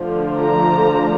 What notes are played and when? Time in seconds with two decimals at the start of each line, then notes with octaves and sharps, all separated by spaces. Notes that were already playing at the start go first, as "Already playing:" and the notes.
Already playing: D3 F3 A3 D4
0.40 A#5